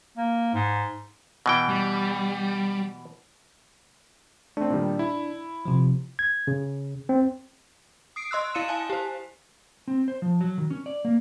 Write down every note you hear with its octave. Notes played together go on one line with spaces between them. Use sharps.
A#3
G#2
B2 E3 G5
G3
A3 C4 D4
A#2 D#3 G3
E4
C3 F3
G#6
C#3
C4
D#6 C7 D7
D#5 C6 E6 F#6
E4 F5 C#7 D#7 E7
F5 G#5 A5
G4 C5
C4
C5
F3
F#3
D#3
C#4
D5
A#3